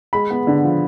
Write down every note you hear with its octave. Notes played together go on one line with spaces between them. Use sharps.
G#3 B5
B3
D3
F3